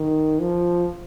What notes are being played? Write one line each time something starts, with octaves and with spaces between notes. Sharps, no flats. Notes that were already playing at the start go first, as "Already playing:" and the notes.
Already playing: D#3
F3